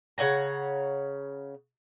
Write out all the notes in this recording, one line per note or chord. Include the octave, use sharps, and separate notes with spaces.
C#3 C#5 F#5 A#5